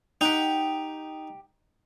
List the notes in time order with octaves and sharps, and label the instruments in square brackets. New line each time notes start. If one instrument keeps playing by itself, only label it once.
[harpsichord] D#4 [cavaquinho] G4 F#5 G5